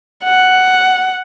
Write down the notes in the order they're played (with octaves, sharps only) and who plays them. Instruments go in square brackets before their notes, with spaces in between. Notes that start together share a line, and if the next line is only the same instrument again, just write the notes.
[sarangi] F#5